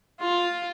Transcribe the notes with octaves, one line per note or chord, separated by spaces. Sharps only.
F4